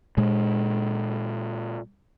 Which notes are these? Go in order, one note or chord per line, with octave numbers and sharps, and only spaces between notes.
A#2 G#3